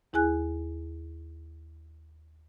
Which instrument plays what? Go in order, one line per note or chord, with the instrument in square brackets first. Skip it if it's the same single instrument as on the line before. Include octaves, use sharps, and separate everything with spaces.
[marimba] D#2 E4 G#4 G#5 F#6